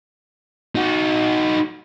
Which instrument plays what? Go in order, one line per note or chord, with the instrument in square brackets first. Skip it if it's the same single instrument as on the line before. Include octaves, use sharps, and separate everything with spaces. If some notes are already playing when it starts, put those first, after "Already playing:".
[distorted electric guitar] D#4 F#4